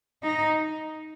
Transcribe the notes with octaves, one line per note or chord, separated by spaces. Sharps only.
D#4